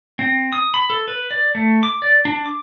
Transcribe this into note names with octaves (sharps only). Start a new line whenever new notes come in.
C4
D#6
B5
A4
B4
D5
A3
D6
D5
D4
D6